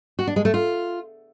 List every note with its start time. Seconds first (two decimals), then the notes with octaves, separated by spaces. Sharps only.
0.19 F#4
0.27 D4
0.36 G#3
0.45 A3
0.54 F4